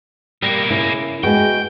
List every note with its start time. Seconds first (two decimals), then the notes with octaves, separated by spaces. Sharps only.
0.42 B2 G3 A#3
0.70 C#3 E4
1.23 G#3 B3 F#4 G5